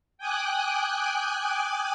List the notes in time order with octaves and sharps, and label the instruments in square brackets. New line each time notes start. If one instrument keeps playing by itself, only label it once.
[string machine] G5 G#5 D6 D#6 F#6